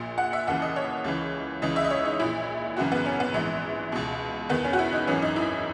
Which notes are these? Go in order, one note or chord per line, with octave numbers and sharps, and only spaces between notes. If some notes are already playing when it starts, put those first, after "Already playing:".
Already playing: A#1 A#2
F#5
E5
D#2 C#3 E3 F#5
D#5
C#5
C#2 C#3 E3
C#2 C#3 E3 D#5
E5
D#5
C#5
D#4
A#1 A#2 E4
G#1 F#2 C#3 E3 F#4
B3
C#4
B3
A#1 G#2 E3
C#2 B2
E2 D#3 B3
C#4
F#4
E4
D#4
G#1 F#2 E3 C#4
D#4
E4